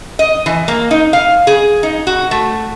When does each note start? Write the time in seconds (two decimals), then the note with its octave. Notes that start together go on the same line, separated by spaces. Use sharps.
0.19 D#5
0.46 E3
0.68 A#3
0.91 D#4
1.13 F5
1.47 G#4
1.83 D#4
2.07 F#4
2.31 A3